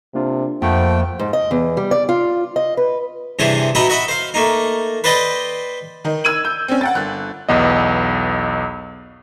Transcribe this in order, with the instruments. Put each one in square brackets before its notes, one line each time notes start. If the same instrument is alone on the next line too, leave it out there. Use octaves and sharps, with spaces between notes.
[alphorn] C3 [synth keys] A#3 D4 F4
[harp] F2 [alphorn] F3 [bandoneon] A3 G5 [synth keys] A#3 E5 F#5
[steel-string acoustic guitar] G#2
D#5
E2
G3
D5
F4
D#5
B4
[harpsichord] G2 C3 E3 D4 G#4 C5
B2 D#4 E5 G5 B5 D#6
F#4 D#5 E5 B5
C5 F5
A3 A#3 D#4
B4 C5 D5 D#5 G5 B5
[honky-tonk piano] D#3 D#4
E6 G#6 D#7 F#7
G6
C4 C#4
F#5 G5 A6
G1 F#6
[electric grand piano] B1 E2 B3 D#5